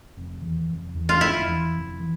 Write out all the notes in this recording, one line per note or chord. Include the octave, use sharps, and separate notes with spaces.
F1
E2 E3
F1
E2 E3
F4
F1 E4
E2 E3
F1
E3